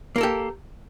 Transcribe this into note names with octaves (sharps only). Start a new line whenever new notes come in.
A#3 G4 A4 A#4